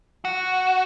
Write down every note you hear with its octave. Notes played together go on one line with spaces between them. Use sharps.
F#4